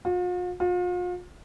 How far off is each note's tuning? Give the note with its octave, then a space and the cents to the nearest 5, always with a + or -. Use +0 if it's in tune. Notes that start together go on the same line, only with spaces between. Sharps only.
F4 +45
F4 +40